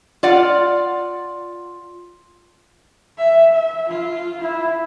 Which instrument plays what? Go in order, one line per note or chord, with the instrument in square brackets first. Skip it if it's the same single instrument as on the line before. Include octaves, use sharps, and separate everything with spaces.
[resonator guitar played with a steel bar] F4 D5 F#5
[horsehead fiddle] E5
E5
F4
E4